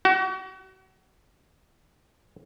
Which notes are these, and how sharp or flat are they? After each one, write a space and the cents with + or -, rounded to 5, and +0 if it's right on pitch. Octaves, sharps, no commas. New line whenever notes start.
F#4 +35